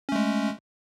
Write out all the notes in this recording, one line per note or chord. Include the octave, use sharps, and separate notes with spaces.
G#3 A3 C#4